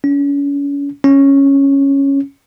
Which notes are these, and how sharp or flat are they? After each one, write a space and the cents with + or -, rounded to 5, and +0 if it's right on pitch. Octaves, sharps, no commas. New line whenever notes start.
C#4 +35
C#4 -5